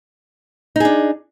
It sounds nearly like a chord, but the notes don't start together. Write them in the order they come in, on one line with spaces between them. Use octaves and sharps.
D#4 G#4 D4